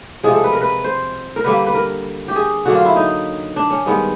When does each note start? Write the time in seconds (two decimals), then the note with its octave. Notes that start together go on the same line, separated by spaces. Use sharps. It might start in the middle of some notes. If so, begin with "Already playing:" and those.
0.23 C3 F3 G#3 G#4
0.33 A4
0.44 B4
0.52 A#4
0.61 B4
0.84 C5
1.36 A#4
1.44 D3 G3 A#3 B4
1.67 B4
1.74 A#4
2.28 G4
2.36 G#4
2.65 D3 F#3 A#3 F#4
2.75 F4
2.85 E4
2.96 D#4
3.56 D4
3.71 C#4
3.86 G2 D#3 G#3 B3